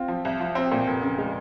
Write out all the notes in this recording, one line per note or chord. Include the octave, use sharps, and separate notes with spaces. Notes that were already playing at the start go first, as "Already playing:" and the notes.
Already playing: C4 F4
F3
C2
F3
C4
A#2
F1
C#3
G#3